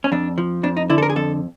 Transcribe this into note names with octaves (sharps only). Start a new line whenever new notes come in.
C#4
F2 D4
F3
F2 D4
D#4
D3 E4
A4
A#4
G#4
F2 A4